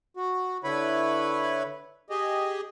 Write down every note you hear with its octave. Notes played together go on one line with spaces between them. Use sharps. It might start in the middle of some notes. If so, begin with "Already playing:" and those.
F#4
D3 E4 B4 C#5 B5
G4 G#4 D#5